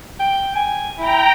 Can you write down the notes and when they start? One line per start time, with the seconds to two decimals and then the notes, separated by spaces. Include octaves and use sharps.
0.20 G5
0.55 G#5
0.98 E4 G5 A#5